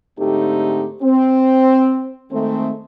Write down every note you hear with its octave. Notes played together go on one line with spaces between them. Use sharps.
G#2 D3 A3 C4 D#4 G4
C4
D#3 G#3 A3 C4